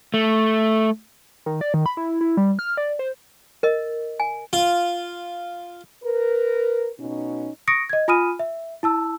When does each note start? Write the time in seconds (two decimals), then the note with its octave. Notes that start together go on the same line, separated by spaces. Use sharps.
0.14 A3
1.46 D#3
1.61 D5
1.74 D#3
1.86 B5
1.97 E4
2.21 E4
2.37 G3
2.59 F6
2.77 D5
2.99 C5
3.63 A#4 D#5
4.20 G#5
4.53 F4
6.04 A#4 B4
6.99 B2 C#4 D#4
7.67 C#6 D#6 A#6 C#7 D7
7.89 D#5 G#6
8.08 F4 G#5 B5 D#6 F6 D#7
8.39 E5
8.83 E4 A5 E6